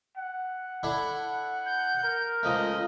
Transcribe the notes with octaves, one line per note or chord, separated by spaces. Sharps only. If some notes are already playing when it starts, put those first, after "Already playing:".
F#5
D4 E4 A4
G6
A#4
C#2 F3 A3 D#5